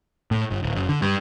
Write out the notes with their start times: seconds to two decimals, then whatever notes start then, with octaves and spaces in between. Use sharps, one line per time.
0.31 A2
0.50 G1
0.63 D1
0.75 F#1
0.89 D3
1.02 G2